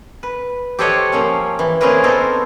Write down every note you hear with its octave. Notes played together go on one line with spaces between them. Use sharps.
B4
G4 A4 C5 C#5 D#5 F#5
F3 A#3 C#4
E3
A#3 C4 C#4 G#4 A#4 B4
B3 C4 D#4 A4 A#4 C5